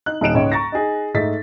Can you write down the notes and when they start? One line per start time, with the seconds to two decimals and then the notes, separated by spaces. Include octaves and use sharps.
0.06 D#4 F#6
0.21 D#1 D#4 D7 E7
0.34 C#2 G#2 C#5 D#5
0.52 A#5 C#6 A6 A#6
0.72 D#4 G#4
1.14 G#2 A3 D#4 A6 B6